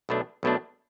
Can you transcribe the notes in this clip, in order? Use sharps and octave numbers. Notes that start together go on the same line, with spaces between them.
B1 B2 A3 D4
B1 B2 A3 D4